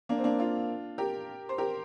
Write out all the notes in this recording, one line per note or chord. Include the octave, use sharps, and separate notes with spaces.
A#3 D4
C4
A#3 D4
D4 F4
G4 A#4
C5
G4 A#4